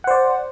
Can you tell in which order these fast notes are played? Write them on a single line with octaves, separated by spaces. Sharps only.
F#5 C5 D5